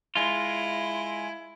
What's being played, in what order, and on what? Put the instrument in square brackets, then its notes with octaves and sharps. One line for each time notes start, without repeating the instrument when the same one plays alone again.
[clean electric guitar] G#3 F4 [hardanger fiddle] E4